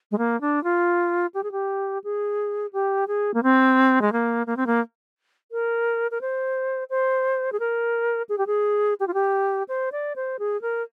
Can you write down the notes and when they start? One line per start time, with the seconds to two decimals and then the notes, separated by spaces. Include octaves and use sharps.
0.11 G#3
0.18 A#3
0.41 D4
0.64 F4
1.34 G4
1.43 G#4
1.52 G4
2.04 G#4
2.73 G4
3.07 G#4
3.34 A#3
3.43 C4
4.02 G#3
4.12 A#3
4.47 A#3
4.57 C4
4.67 A#3
5.52 A#4
6.11 A#4
6.21 C5
6.90 C5
7.52 G#4
7.60 A#4
8.29 G#4
8.38 G4
8.47 G#4
9.00 G4
9.07 F4
9.14 G4
9.68 C5
9.92 D5
10.16 C5
10.39 G#4
10.62 A#4